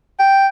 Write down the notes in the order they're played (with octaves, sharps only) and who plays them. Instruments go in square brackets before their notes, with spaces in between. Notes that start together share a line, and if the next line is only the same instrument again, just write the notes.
[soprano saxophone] G5